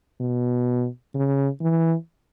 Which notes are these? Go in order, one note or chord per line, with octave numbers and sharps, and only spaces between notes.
B2
C#3
E3